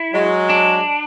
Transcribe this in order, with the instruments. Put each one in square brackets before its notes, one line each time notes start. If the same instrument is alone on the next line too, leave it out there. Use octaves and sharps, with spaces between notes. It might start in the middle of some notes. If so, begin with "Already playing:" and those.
Already playing: [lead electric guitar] E4
[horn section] F#3 G#3
[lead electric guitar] D4